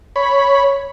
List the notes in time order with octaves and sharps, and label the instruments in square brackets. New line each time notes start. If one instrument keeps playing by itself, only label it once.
[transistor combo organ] C#5 B5